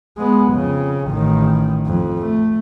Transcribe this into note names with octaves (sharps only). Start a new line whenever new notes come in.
G#3 B3
F2 C#3
A1 D#3
F2
A3